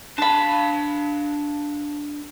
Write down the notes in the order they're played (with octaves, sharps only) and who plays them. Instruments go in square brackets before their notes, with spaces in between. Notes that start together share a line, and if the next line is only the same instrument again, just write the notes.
[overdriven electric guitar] D4 F5 [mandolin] A5 B5